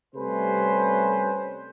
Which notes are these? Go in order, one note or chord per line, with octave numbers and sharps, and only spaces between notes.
C3 G3 A3 C#4 B4 C5